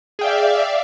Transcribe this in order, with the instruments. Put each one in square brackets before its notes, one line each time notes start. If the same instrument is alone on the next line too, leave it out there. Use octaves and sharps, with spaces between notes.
[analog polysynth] G#4 G5 [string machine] D5 E5 F5